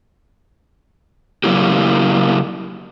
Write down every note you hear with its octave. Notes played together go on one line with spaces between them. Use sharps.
C#3 F#3 A#3 E4 G4